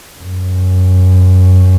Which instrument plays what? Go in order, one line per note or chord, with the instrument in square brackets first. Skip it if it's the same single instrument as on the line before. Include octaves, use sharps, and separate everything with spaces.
[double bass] F#2